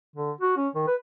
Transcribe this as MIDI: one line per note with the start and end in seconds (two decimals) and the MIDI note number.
0.16 0.31 50
0.41 0.56 66
0.57 0.68 61
0.75 0.84 51
0.87 0.95 71